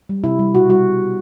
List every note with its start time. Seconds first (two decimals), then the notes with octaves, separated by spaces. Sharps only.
0.09 G3
0.24 C3 E4
0.39 G3
0.55 B2 F#4
0.69 G3 F#4